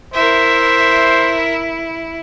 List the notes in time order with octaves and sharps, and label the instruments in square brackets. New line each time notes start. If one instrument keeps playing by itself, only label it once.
[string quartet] E4 [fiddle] A#4 E5 [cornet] C5